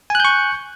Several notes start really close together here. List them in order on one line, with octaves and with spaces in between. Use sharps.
G#5 F#6 G6 C#6